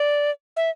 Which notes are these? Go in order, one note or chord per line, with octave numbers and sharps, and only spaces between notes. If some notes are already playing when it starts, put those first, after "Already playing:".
Already playing: D5
E5